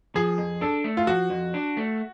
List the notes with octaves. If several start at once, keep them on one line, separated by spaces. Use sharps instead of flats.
F3 G#4
F2
D4 A4
A3
F4
F3 F#4
F2
D4
A3